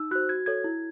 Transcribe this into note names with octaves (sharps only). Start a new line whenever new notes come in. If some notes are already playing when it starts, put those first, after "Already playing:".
Already playing: D#4 E6
F#4 C5 F#6
F#4 G#6
A4 C#5 G#6
E4